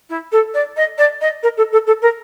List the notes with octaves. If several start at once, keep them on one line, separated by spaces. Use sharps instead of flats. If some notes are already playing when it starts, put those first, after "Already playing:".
E4
A4
D5
D#5
D5
D#5
A#4
A4
A4
A4
A#4